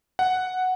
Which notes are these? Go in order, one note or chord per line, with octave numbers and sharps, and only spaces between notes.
F#5